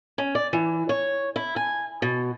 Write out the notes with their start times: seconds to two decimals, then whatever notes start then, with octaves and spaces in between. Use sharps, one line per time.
0.18 C#4
0.35 D5
0.53 E3
0.89 C#5
1.36 E4
1.56 G#5
2.02 B2